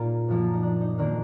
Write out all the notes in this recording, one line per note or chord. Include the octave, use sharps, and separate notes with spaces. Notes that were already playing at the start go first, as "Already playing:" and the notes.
Already playing: A#2 A#3 D#4 F4 G#4 A#4
F#2 F3 A#3
D#4
D4
D#4
F2 D#3 A#3 D4